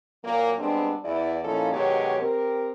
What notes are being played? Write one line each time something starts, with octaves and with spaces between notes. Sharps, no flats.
A#2 F#3 A#3
G3 G#3 B3 C4 D4
E2 E4 D5
A#2 F3 C#4 D#4 E4 A4
B2 D#3 F#3 G#3 G4 C#5
C4 G4 A#4